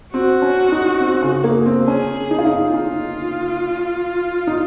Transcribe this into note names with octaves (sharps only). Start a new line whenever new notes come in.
C4 F#4
C#4
D#4
C4
C#3
A#3
C4
C#4 G#4
D#4
F4
D#4
D#4 F4
D#4